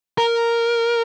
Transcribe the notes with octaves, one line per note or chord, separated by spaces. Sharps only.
A#4